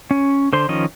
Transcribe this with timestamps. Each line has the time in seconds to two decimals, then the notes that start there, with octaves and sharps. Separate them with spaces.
0.11 C#4
0.53 D3 C5 C6
0.69 D#3 F3 C#4 D#5